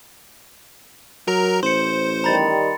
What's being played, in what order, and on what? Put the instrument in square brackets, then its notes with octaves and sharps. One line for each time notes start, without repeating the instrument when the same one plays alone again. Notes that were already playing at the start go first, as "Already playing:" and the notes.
[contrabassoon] F#3 [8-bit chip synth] A#4 A#5
[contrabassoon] A1 [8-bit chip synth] C5 [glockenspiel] C6 C#7
[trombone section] D#3 G3 [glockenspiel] A#5 B5 A6